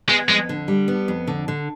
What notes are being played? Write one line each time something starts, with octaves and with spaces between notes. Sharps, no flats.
G#3 B3
F2 G#3
D3
G3
B3
F2
D3
D3